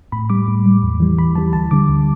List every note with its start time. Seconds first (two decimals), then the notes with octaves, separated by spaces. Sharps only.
0.12 A2 B5
0.30 G3 D6
0.48 A2
0.66 G3
0.83 E2
1.00 E3 G3
1.18 E2 B5
1.35 E3 G3 A5
1.53 D2 A5
1.71 D3 G3 D6
1.89 D2